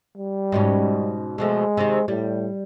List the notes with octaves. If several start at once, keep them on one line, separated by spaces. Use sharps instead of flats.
G3
G#2 B2 C#4
B2 F3 G#3 A3
C3 D#3
A2 G3